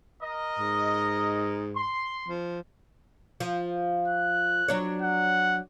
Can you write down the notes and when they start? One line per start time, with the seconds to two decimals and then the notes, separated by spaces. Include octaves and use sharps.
0.21 A#4 D#5
0.59 G#2
1.75 C6
2.28 F3
3.40 F3
4.08 F#6
4.68 F#3 D4 C#5
5.02 F#5